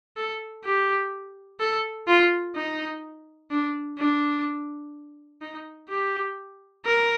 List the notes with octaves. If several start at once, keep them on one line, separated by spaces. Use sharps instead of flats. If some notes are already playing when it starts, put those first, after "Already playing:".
A4
G4
A4
F4
D#4
D4
D4
D#4
G4
A#4